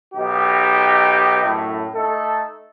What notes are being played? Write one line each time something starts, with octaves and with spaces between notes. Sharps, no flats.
B1 D#4 G4
F#2 A2
A3 D#4 A4